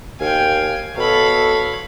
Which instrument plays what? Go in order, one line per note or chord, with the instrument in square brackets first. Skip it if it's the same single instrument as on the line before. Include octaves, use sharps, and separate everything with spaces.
[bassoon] D#2 [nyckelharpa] F5 G5 [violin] G#5
[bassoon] B2 [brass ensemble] A4 [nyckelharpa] C#5 [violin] F5 B5